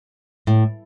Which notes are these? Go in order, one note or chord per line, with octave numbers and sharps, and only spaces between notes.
A2